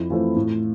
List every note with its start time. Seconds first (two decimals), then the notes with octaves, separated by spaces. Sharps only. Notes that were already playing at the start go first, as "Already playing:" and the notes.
Already playing: F2 E4
0.10 E3 A3 C4 F4
0.36 A2